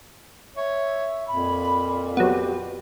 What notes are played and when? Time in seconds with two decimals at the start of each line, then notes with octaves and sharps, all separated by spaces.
0.56 C#5 E5
1.28 F2 A#2 B5
2.17 F#3 B3 G4